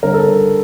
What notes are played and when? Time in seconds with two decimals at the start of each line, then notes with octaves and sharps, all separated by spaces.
0.03 D3 G3 A#4
0.14 A4